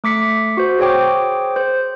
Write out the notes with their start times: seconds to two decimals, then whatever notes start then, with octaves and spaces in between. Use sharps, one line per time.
0.04 A3 D6 B6 C#7
0.57 F#4 C5
0.79 G#4 C5 C#5 G5 D6
1.56 C5